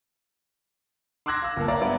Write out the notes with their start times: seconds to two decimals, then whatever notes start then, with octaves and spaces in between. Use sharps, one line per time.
1.26 C6 D6 E6 F#6 G#6 A#6
1.42 F5 E6
1.57 G1 A#3 A5
1.68 C#5 D5 E5 F5 A#5 D6
1.81 G2 B3 D5 A#5